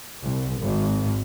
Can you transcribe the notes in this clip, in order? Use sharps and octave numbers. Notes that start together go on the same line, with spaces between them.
C2
G#1